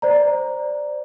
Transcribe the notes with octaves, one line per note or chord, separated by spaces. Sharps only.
C5 D5 A#5